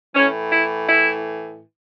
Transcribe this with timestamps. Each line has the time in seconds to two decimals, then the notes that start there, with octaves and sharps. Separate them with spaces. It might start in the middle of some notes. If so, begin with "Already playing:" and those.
0.15 A2 E3 C#4
0.52 E4
0.88 E4